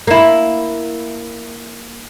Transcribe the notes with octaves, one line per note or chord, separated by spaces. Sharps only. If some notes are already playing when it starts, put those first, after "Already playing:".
A#3 E4